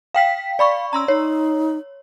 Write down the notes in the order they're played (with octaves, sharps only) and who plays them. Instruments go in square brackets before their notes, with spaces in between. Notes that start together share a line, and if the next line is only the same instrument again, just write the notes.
[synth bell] F5 G5 B6
[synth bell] D5 B5 C#6 [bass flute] F5
[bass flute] C#4 [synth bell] A#5 C6 E6
[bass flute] D#4 [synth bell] C#5